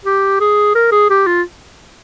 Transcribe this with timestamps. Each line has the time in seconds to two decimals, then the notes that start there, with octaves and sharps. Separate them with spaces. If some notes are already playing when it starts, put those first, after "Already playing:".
0.05 G4
0.40 G#4
0.75 A#4
0.92 G#4
1.10 G4
1.27 F4